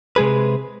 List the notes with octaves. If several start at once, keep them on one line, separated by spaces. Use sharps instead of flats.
C3 G#3 G#4 B4